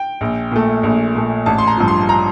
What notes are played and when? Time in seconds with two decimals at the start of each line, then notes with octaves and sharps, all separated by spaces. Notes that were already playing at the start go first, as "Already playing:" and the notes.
Already playing: G5
0.21 A#1
0.51 A#2 A3
0.83 A#1
1.15 A#2 A3
1.46 A1 A5
1.58 C6
1.67 A#5
1.78 G2 F3
1.88 C6
2.09 A#5